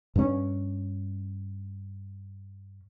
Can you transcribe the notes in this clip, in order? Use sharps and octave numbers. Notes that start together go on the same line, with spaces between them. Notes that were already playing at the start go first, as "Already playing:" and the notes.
G2 C#4